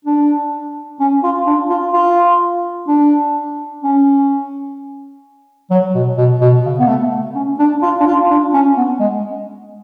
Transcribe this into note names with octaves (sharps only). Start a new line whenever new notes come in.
D4
C#4
F4
D4
F4
F4
D4
C#4
F#3
B2
B2
B2
C#3
B3
A3
C#4
D4
F4
D4
F4
D4
C#4
B3
G#3